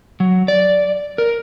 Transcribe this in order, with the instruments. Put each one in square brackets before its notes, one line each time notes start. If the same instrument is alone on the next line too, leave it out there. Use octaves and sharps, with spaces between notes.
[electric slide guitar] F#3
D5
A#4